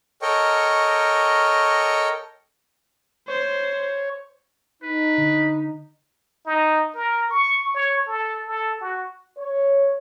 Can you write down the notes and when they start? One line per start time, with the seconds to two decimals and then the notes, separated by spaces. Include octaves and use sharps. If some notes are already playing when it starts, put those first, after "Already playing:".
0.22 A4 A#4 C#5 D#5 G5 C#6
3.28 C5 C#5
4.83 D#4 B4
5.18 D3
6.46 D#4
6.95 A#4
7.31 C#6
7.74 C#5
8.07 A4
8.47 A4
8.81 F#4
9.37 C#5